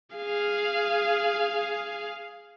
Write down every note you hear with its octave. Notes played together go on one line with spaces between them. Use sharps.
G#4 F5